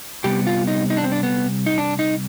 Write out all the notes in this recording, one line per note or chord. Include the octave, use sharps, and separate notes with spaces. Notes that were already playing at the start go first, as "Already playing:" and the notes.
C3 G3 B3 G4
F4
D#4
D#4
D4
C4
D4
B3
D#4
D4
D#4